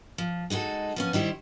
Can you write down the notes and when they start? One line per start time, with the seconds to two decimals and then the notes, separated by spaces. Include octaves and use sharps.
0.18 F3
0.50 G#3 D#4 E4 F#4 A4
0.96 F3 B3 C#4
1.13 D#3 G3 E4 C5